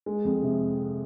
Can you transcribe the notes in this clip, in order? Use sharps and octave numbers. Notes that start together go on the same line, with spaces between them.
G#3
F2
C3